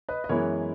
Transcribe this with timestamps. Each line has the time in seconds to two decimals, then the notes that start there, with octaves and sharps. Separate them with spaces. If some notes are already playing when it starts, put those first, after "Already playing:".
0.09 B4 D#5
0.24 D#5
0.29 F#2 E3 G#3 B3 E4 A#4 C#5